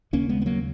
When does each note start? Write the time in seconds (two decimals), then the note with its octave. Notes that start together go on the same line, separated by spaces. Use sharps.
0.13 D#2 C#3 A#3 C#4
0.29 G#3 B3
0.42 B3
0.46 F#3 A#3